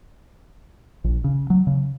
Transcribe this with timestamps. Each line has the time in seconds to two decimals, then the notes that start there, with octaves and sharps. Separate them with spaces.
1.04 A#1
1.24 C#3
1.50 F#3
1.67 C#3